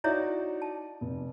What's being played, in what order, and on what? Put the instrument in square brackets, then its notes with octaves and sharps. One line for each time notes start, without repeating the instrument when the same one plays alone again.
[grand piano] D#4 F#4 D5 [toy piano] E4 C#5 E5
[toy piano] A5
[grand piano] F1